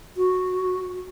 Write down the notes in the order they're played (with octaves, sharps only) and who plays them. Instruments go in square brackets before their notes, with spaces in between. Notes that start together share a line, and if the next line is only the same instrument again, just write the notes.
[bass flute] F#4